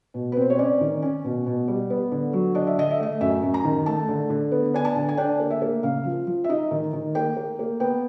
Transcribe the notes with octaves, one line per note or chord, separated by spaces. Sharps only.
B2
B4
C4 C5
C#5
C#4 D5
D#3
C#4
B2
B2
G3
B3
D3
F#3
D4 D#5
E5
D3 D#5
E5
A3 D#5
F#2 E5
F#2
A#5
D#3
A3 A5
D3
D3
B3
D4 G#5
A5
D3
G#5
D4 G5
A#3
E5
A#3
C#3 F5
F3
F3
E5
D#4 D#5
D#3
D#3
A#3 G5
A#3
A#3
B3 G5